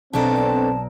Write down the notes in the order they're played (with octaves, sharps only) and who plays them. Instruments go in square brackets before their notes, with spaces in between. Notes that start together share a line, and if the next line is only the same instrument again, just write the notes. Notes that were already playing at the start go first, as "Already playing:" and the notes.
[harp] B1 D5 A#5 [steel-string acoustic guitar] B2 D4 A4 [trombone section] C4 [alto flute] A5